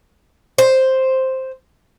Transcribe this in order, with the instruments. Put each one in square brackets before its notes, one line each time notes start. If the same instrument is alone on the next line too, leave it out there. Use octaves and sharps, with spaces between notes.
[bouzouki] C5